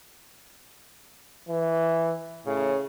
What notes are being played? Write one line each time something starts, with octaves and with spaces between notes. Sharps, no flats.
E3
A2 C#3